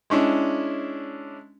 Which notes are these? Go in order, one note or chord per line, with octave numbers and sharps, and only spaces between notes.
G#3 C#4 D4 E4